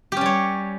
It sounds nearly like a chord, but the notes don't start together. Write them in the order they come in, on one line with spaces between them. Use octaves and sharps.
G4 C#4 G3 C#5